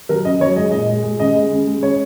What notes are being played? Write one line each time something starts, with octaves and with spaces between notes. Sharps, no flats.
F#3 A#4
C#3 D#5
F#3 C#5
G#3 D#5
A#2 D#5
G#3
G#3
C#3 D#5
G#3
C#3
G#3
C#3 C#5